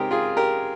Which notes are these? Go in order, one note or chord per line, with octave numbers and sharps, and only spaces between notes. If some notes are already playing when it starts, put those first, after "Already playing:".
Already playing: C#3 G#3 C4 D#4 G4 A#4
F4 G#4
G4 A#4